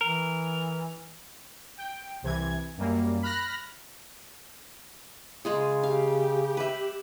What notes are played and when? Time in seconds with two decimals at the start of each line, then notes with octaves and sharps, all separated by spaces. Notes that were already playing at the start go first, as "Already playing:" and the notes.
0.01 E3 A#4
1.78 G5
2.22 C2 C3 E3 G#6
2.77 F#2 G3 A#3
3.22 B5 F6 F#6 A#6
5.45 C#3 G#3 F4 G#4
5.83 G4 F5
6.57 B4 E5